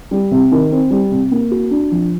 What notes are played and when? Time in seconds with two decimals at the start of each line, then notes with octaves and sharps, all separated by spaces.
0.11 G3
0.31 C3
0.52 D#3
0.71 C4
0.91 G3
1.11 C3
1.31 A#3
1.51 F#4
1.71 D4
1.91 F3